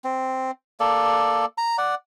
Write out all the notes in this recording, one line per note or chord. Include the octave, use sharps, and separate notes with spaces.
C4
A#3 A4 D5
A#5
D5 F#5